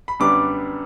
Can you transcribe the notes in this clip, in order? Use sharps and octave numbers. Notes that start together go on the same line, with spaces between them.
B5
F#2 D3 G3 B3 D4 D6